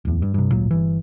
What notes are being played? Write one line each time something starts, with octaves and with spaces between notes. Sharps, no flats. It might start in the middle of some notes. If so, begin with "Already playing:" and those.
D1 E2
G2
G2 C3
D1 G#1 A#2 F#3
G1 E3